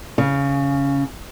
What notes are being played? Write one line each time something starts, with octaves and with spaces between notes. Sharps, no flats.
C#3